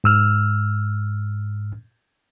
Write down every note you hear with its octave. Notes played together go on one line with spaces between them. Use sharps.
G#2 E6 F6